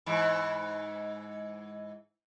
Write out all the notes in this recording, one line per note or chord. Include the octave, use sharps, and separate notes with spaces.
G#2 E3